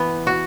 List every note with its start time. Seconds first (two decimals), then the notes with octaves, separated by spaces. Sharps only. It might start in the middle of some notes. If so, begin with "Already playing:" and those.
Already playing: E3 B3
0.27 F#4